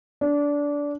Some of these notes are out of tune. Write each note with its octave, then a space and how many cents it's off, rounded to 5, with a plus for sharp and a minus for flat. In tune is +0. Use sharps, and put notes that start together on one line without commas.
D4 -20